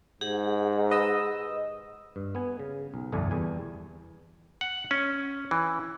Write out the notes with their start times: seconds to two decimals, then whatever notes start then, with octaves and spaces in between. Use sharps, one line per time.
0.21 G#2 G4 G#4 F#5
0.90 B4 D#5 E6
2.16 G2
2.35 B3 G#5
2.59 C#3
2.94 B1
3.12 G1 C2 F2 A3 D5 G#5
3.31 E2 G3 G#5
4.61 F#5
4.91 C#4
5.51 E3